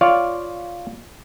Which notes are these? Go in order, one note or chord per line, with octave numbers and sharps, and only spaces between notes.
F4 C#5 D5 F5